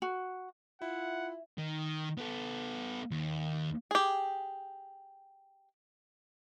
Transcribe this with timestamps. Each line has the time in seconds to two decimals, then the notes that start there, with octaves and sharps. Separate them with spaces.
0.02 F#4
0.82 E4 F4 E5 F#5
1.58 D#3
2.18 B3 A4
3.11 D#2
3.91 G4 G#4